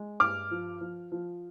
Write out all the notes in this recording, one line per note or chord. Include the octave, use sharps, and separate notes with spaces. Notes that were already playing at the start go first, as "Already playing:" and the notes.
Already playing: G#3
G2 D6 F6
F3
F3
F3